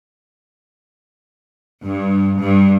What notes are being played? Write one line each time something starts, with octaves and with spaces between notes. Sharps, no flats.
G2
G2